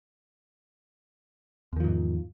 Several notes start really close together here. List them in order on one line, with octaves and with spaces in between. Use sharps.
E2 D#3 F3 G#2